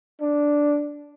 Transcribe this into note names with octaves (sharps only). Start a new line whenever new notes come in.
D4